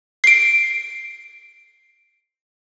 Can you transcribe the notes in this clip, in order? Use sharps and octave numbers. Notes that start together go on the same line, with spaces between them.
C7 D7